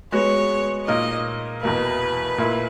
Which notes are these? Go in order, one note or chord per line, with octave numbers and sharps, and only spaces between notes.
G#3 B3 F#4 C#5
A#2 A#3 D#4 A#4 D#5
E2 B2 A#3 B4
A#2 A#3 E4